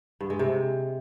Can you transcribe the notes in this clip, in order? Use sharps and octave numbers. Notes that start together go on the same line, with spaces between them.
G2
G#3
C3